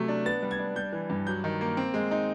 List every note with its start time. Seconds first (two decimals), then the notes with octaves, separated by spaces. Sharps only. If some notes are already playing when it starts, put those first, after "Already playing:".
Already playing: C3 F#3 A3
0.08 D4
0.25 B3 A6
0.42 G3
0.51 G#6
0.59 D4
0.76 G3 G6
0.92 E3
1.10 G2
1.27 F#3 G6
1.44 D#3
1.61 A#3
1.77 C4
1.94 G#3
2.11 D#4